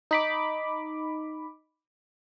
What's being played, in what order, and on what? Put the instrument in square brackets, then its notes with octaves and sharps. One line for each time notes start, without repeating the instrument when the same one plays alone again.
[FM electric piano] D#4 B5 D6